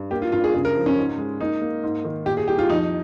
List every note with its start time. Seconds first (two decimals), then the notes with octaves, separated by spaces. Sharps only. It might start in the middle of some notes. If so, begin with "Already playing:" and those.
Already playing: G2
0.11 A#3 G4
0.22 F4
0.32 G2 F4
0.44 G#4
0.54 C#3 G#4
0.65 A#4
0.75 F3
0.86 C#4
0.98 G#2
1.18 G#3
1.41 A#3 D#4
1.62 A#3
1.83 G#2
2.05 D#3
2.26 A#2 G4
2.37 G#4
2.48 C2 G4
2.58 F4
2.70 F2 D#4